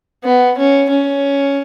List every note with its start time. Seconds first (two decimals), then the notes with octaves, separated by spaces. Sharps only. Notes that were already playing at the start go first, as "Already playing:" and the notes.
0.24 B3
0.58 C#4
0.90 C#4